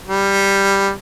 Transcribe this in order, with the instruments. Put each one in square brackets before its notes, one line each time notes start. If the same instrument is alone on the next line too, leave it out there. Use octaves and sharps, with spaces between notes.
[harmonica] G3